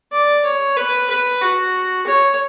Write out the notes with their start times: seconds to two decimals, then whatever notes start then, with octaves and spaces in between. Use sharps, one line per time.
0.12 D5
0.45 C#5
0.77 B4
1.10 B4
1.42 F#4
2.07 C#5